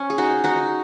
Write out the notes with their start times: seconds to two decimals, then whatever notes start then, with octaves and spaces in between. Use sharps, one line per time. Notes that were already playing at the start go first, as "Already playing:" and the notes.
Already playing: C#4
0.10 G#4
0.18 D#4 F#4
0.44 D#4 F#4